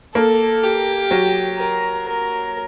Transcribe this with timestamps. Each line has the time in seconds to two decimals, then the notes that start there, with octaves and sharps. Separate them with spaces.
0.15 A#3 A4
0.63 G4
1.11 F#3
1.59 A#4
2.08 A#4